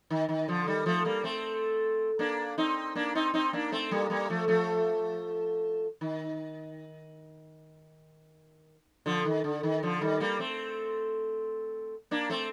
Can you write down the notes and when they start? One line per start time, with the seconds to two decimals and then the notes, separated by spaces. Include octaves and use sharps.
0.10 D#3
0.29 D#3
0.48 D3 F3
0.66 D#3 G3
0.86 F3 A3
1.05 G3 A#3
1.24 A3 C4
2.19 A#3 D4
2.58 C4 D#4
2.95 A#3 D4
3.15 C4 D#4
3.34 C4 D#4
3.53 A#3 D4
3.72 A3 C4
3.91 G3 A#3
4.10 G3 A#3
4.30 F3 A3
4.48 F3 A3
6.01 D#3
9.06 D3 F3
9.25 D#3
9.44 D3
9.63 D#3
9.83 D3 F3
10.01 D#3 G3
10.20 G3 A#3
10.39 A3 C4
12.11 A#3 D4
12.30 A3 C4